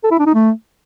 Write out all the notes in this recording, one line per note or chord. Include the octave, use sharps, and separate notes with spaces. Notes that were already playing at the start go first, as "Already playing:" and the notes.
A4
E4
D4
D#4
A3